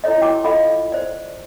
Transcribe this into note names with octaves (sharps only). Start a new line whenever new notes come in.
E4 F4 A4 C#5 D#5
F#4 G5 C#6 D6
F4 A4 D#5 F5 B5
C5 D5